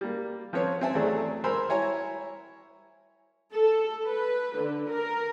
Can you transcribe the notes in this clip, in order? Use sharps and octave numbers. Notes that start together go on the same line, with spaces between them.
G3 A#3
F3 C4 B4 C#5
C4 E5 G#5 A5
E2 F#3 A3 G#4 D5
A#4 C5 G#5 B5 C6 E6
E4 C#5 G#5 A#5
A4
B4
D3
A#4